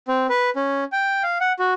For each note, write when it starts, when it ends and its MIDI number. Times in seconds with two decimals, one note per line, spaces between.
0.08 0.27 60
0.29 0.50 71
0.56 0.84 61
0.92 1.23 79
1.23 1.38 77
1.41 1.53 78
1.59 1.74 66